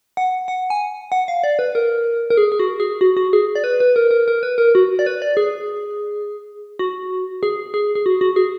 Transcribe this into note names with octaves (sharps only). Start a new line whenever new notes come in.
F#5
F#5
G#5
F#5
F5
D5
B4
A#4
A#4
G#4
G#4
F#4
G#4
F#4
F#4
G#4
D5
B4
B4
A#4
A#4
A#4
B4
A#4
F#4
D5
B4
D5
G#4
F#4
G#4
G#4
G#4
F#4
F#4
G#4